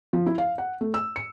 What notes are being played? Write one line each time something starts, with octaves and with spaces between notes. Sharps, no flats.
F3
E4
F5
F#5
A3
E6
C#7